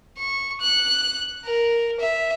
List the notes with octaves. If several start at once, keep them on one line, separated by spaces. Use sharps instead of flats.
C#6
F#6
A#4
E5